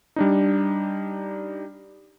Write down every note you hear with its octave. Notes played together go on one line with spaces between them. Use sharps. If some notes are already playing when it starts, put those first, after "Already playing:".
G3 D4 D#4